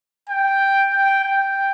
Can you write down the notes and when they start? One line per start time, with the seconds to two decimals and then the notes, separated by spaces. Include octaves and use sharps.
0.30 G5
0.93 G5
1.24 G5